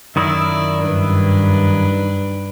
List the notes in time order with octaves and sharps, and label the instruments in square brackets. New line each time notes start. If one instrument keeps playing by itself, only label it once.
[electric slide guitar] F#2 D#3 E4 [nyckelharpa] D5 E5
[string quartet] G2 [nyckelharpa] D4 B4